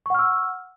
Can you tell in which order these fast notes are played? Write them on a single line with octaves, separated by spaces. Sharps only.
C#6 F#5 F6 E6